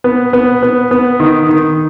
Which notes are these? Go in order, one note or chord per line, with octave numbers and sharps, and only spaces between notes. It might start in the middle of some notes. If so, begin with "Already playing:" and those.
B3
B3
B3
B3
D#3
D#3